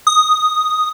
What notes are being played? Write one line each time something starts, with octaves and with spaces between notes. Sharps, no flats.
D#6